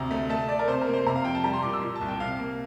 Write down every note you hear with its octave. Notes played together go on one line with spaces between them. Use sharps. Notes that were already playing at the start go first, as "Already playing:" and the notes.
Already playing: D2 C3 A#5
A3
A3 A5
A3 D5
A#4
C3 C5
A#4
A#3
C5
C3 A#5
F5
F2 G5
A5
G3 A#5
C6
A#2 D6
E6
A#2
A5
C2
G5
C3 F5
A#3